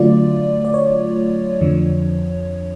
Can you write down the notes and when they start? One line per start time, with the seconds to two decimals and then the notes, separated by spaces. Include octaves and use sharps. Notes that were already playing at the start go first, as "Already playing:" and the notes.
Already playing: D3 F#3 A3 F4 D5
0.65 D5
0.74 C#5
1.61 F2 D3 F3